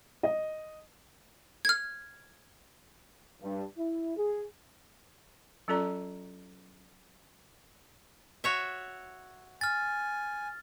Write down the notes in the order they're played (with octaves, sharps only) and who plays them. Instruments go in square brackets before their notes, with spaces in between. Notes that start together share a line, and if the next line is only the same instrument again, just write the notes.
[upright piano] D#5
[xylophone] F6 G#6
[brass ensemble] G2
E4
G#4
[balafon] F#3 C#4 F4 A4 D5 A#5
[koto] F#4 C#5 E5
[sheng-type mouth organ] G#5 [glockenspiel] F6 A6